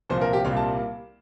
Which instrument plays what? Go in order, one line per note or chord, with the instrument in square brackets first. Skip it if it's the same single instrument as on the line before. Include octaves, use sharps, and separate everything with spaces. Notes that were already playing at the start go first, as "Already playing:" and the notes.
[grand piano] C2 A#2 F3 C5
A#4
G4
C2 A#2 G3 A#3 F5
A5